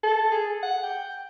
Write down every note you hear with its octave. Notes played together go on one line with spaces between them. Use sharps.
A4
G#4
F#5
G5